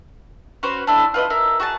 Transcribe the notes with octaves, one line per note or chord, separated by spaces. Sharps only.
C#4 F#4 B4 C5
D4 E4
F4 B4 D5 D#5
E4 A#4
F#4 G#4 A5